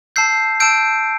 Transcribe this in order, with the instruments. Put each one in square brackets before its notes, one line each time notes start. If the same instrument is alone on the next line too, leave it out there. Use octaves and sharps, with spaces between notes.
[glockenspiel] A5 E6 G6 C7
A5 E6 G6 D7